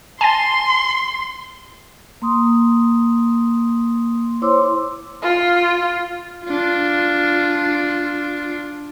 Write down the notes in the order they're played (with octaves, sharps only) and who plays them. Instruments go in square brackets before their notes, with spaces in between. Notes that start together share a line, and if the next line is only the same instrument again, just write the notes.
[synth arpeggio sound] G#5 A5 A6 [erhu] C6
[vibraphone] A#3 C6 D#6
E4 C5 C#5 C6 D6 E6
[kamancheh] F4
[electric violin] D4 F4